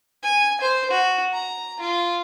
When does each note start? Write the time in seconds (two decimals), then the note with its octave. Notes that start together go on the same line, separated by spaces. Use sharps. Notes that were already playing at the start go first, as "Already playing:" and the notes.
0.23 G#5
0.61 C5
0.91 F#4
1.33 A#5
1.80 F4